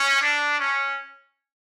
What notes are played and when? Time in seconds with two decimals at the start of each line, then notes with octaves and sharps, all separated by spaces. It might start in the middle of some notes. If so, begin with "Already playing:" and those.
Already playing: C#4
0.21 D4
0.59 C#4